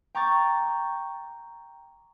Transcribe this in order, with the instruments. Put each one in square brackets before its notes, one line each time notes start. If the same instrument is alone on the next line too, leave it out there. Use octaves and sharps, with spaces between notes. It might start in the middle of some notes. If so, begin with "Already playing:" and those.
[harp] G5 A#5 C#6 D6 G6 A6